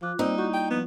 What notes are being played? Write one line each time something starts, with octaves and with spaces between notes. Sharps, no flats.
F3 F4 D6 F#6
G3 A#3 C4 D#4 D5
E4 F#4 C#6 G6
G5
F3 B3